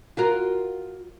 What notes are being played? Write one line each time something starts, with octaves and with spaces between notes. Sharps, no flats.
F4 F#4 A#4